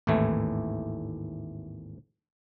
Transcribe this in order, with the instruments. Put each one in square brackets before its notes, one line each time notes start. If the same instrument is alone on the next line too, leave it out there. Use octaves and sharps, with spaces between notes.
[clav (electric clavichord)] G#1 D#2 A2 E3 A3